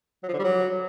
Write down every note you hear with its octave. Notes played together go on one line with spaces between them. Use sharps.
F#3
F3
D3
G3
F#3